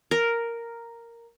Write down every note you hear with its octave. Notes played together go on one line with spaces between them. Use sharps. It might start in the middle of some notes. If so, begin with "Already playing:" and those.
A#4